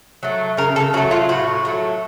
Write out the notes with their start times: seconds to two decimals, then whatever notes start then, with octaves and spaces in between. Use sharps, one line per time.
0.23 F#3 A3
0.57 C#3 A#4
0.76 A4
0.93 F#3 F#4
0.98 A3
1.11 F4
1.29 A2 F#4
1.65 F#3 A3